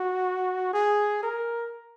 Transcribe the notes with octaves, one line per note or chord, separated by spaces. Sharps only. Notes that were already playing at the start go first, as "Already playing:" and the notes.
Already playing: F#4
G#4
A#4